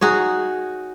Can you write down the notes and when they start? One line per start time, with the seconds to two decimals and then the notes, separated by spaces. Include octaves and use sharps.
0.01 D#4 F#4 G#4 C#5